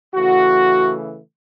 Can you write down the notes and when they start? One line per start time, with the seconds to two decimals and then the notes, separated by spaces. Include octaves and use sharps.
0.14 C#3 E3 A3 F#4